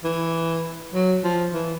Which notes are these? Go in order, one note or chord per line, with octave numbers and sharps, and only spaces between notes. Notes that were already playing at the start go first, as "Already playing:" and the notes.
E3
F#3
F3
E3